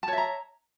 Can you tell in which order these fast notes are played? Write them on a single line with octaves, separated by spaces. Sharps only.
A5 C#5 E5 A#5